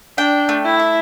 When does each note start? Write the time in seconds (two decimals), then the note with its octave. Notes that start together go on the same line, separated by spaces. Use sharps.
0.18 D4 G5
0.49 A3
0.65 E4
0.79 E5